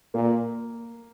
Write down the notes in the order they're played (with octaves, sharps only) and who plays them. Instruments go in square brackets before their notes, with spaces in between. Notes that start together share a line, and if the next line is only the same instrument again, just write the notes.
[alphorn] A#2 [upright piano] A#3